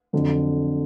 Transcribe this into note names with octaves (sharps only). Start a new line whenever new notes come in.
F2 D3 F#3